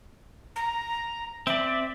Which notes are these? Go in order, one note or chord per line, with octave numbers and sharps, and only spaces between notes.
A#5
C4 D5 E5